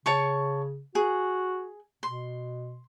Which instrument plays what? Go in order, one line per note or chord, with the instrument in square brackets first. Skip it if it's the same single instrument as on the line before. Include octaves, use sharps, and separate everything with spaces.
[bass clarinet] C#3 [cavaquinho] C#5 A5 C#6
[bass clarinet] F#4 [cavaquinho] G#4
[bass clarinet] B2 [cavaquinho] C6